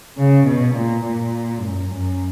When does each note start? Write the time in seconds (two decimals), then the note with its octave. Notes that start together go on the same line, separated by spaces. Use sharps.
0.18 C#3
0.46 B2
0.74 A#2
1.04 A#2
1.60 F#2
1.88 F#2